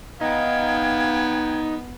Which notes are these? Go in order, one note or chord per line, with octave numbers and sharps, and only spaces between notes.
B3 D#4 F5 G5 G#6